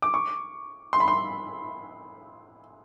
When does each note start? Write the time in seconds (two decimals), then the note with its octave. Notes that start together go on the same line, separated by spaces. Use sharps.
0.02 D6
0.14 C#6
0.93 C6
1.00 B5
1.08 C6